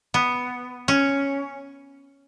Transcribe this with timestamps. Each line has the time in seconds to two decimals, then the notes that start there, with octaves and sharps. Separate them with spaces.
0.14 B3
0.88 C#4